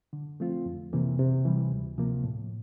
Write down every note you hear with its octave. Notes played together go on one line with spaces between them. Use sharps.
D3
F3 A3 C4 F4
F2
C3 E3 A#3
C3
E3 G3
D2
C3 F3 A#3
A2